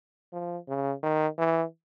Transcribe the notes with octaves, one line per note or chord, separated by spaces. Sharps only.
F3
C#3
D#3
E3